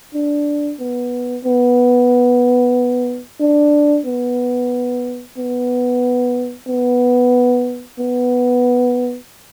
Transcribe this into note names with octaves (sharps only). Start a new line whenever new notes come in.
D4
B3
B3
D4
B3
B3
B3
B3